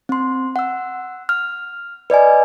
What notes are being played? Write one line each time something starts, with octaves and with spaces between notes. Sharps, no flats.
C4 C6
F#5 E6
F6
B4 D5 D#5 G#5